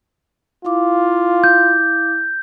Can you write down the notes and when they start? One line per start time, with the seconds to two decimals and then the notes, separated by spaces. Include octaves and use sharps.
0.65 E4 F4 F5 D6
1.44 G6